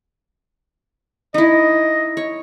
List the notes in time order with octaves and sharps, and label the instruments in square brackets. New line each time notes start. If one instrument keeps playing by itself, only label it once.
[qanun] D#4 E4 [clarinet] D#5
[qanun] C#5